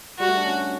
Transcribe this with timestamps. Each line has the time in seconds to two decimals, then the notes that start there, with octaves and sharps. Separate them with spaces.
0.20 G3 F#4
0.28 A3
0.37 D4
0.46 C#4